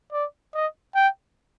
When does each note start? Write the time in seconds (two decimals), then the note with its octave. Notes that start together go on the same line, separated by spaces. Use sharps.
0.12 D5
0.54 D#5
0.95 G5